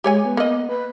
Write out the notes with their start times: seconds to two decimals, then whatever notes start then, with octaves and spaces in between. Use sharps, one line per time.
0.04 G#3 G4 C#5 G#5
0.25 B3
0.37 A#3 D#5
0.69 B4